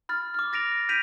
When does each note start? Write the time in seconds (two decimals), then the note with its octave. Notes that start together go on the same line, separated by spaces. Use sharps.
0.09 B5 F6 A6
0.34 D6 F6
0.53 A6 A#6 D7 F7
0.89 G6 B6 D7 D#7 F7